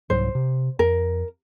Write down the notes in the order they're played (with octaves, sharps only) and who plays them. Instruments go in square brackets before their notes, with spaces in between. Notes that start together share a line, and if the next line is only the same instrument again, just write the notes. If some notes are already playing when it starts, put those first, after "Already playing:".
[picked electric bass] C2 G#2 F#3 [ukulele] C5
[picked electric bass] C3
[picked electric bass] F2 [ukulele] A#4